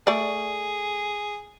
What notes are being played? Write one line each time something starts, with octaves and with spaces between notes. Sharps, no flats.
A3 G#4 D5